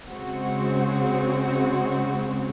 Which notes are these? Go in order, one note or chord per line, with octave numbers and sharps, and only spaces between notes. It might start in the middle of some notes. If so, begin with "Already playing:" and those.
C#3 G#3 C4 F#4